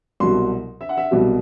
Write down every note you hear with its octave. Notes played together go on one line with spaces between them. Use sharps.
C2 B2 F#3 C6
E5
F#5
E5
C2 B2 F#3